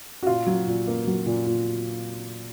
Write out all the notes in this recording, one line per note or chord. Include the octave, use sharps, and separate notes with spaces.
F#4
A#2 F4
F#3
A#2
A#3
F#3
A#2
A#2